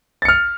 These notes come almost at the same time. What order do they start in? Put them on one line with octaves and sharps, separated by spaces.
A6 C#7 F6